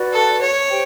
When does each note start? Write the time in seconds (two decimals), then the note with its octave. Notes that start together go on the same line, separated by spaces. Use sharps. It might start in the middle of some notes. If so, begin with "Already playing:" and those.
Already playing: F#4 B4 D5
0.13 A4
0.41 C#5
0.69 G4 C5 G5